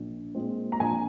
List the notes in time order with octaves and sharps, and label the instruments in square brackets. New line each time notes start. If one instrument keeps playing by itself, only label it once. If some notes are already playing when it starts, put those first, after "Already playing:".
Already playing: [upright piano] A#1
A#2 G#3 C4
A#5
A#1 G#5